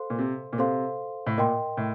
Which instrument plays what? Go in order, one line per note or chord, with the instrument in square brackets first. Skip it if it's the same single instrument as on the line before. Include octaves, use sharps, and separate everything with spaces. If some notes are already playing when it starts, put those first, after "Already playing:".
Already playing: [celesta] A4 C5 F5 C6
[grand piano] A#2
C3
A#2
[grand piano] C3 [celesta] A4 C5 F5 C6
[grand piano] A2
[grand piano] A#2 [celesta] A#4 D#5 G5 C6
[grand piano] A2